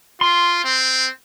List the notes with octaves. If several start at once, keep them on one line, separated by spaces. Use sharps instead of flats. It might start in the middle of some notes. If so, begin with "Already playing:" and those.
F4 C6
C4